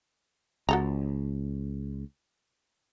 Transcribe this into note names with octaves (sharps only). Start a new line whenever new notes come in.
C#2 F#4 A4 A#5